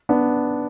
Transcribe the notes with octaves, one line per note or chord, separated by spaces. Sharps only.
B3 D4